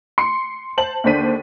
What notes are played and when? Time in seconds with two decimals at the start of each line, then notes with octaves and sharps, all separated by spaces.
0.18 C6 C#7
0.77 C5 A5 F#7
1.04 D#2 D3 D4 C5 B6 D#7